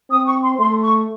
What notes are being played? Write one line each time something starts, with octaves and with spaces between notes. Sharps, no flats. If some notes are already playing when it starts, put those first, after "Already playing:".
C4 D#6
C#6
C6
A3 C6
C#6